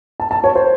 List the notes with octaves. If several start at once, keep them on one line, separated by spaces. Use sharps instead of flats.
A5
A5
C#5
C5